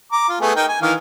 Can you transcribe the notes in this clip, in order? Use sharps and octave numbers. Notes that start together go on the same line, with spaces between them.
A#5 D6
F4
A3 B3 G#4
D#4 A#4 G5
G#5
D#3 E3 F5